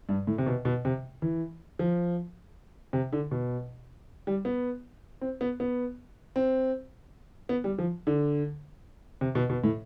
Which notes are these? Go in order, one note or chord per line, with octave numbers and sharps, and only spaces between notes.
G2
A2
C3
B2
B2
C3
E3
F3
C3
D3
B2
G3
B3
C4
B3
B3
C4
B3
G3
F3
D3
C3
B2
B2
A2